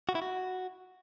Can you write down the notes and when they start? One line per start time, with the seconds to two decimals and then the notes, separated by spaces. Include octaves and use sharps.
0.09 F#4
0.15 E4
0.22 F#4